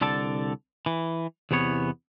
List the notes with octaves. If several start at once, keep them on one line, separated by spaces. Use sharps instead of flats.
C2 D3 A4 D5 A5
E3
E2 C3 E3 B3 C#5